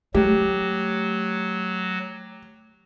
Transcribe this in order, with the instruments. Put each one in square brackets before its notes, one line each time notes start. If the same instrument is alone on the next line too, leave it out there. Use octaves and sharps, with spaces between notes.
[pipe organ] F#3 [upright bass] A3 [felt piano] G4